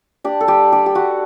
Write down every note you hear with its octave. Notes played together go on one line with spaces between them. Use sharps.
D4 G4
A4
G3 G4
D4 G4
G4
G3 F#4